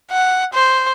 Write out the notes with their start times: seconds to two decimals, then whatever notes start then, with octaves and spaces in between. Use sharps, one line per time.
0.11 F#5
0.53 C5